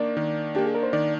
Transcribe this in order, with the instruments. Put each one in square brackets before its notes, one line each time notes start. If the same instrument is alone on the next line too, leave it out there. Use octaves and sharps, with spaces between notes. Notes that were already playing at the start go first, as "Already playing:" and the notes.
Already playing: [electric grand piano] D#3 A#3 D4 [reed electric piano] D5
[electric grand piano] D#3
[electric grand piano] A#3 D4 [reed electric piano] G4
[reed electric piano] G#4
A#4
C5
[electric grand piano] D#3 [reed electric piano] D5